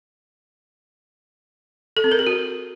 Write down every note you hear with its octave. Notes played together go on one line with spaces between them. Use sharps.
A4
C4
A#4
G#4
F#4